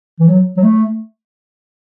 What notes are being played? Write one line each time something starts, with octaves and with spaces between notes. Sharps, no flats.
E3
F#3
F#3
A3